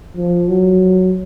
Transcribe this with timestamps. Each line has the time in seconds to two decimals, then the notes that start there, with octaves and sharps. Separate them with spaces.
0.16 F3
0.48 F#3